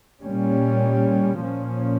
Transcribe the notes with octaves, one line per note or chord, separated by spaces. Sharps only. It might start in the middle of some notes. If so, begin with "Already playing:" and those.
A#2 G3 C#4
A#2 F3 C#4